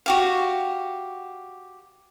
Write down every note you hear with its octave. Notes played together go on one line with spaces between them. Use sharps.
F#4 G4 F5